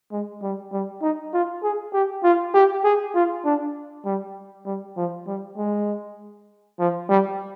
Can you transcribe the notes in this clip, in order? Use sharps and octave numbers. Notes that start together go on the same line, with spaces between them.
G#3
G3
G3
D#4
F4
G#4
G4
F4
G4
G#4
F4
D4
G3
G3
F3
G3
G#3
F3
G3